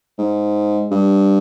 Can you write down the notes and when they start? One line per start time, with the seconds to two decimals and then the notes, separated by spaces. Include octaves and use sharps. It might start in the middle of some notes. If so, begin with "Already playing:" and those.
0.18 G#2
0.91 G2